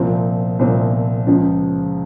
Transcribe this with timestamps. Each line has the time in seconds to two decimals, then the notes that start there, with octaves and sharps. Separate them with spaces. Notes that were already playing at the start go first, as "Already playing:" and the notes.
Already playing: C2 A#2 F3 C4
0.59 C2 A#2 F3 C4
1.27 C#2 C#3 F3